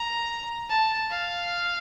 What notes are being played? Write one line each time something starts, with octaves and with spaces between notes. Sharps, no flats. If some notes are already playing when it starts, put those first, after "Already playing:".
Already playing: A#5
A5
F5